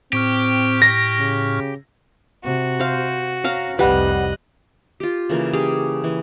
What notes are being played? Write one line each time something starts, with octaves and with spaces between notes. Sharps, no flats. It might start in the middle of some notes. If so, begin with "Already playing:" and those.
A2 C4 G4 C#6 F6
A#6
C#3
C3 F#4
C5 F5
C#4 F5 A#5
F1 C2 G3 B4 D#5 F#5 F#6
F4 G4
C#3 E3 A#3
C#4 G4 G#4
E3